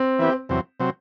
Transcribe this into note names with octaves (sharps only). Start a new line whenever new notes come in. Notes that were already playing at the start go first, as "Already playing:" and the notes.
Already playing: C4
E3 B3 E4 G4
E2 C3 F#3 C4
C3 F#3 C4